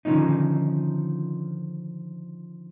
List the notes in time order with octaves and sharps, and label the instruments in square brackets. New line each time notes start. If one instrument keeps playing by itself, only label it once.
[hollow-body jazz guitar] D3 D#3 F3 C#4 D#4